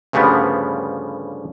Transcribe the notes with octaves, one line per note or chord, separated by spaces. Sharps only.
D2 G2 C#3 F3 G3 B3